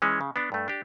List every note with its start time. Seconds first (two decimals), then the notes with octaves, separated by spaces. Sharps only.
0.02 E3 G#3 C#4
0.21 C#3
0.36 B3 D4
0.52 G2 A3
0.68 D4 G4